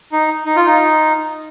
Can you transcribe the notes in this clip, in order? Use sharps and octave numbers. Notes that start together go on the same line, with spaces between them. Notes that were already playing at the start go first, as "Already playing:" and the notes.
D#4
D#4
F4
D#4